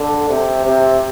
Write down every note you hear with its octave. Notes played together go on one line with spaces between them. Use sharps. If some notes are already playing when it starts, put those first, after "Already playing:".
Already playing: D3
C3
C3